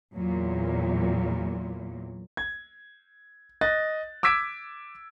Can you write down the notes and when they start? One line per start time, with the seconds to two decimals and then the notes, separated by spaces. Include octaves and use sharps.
0.15 E2 A#2 F#3
2.37 G#6
3.61 D#5 F#6 A6
4.23 D6 E6 G#6 B6 D7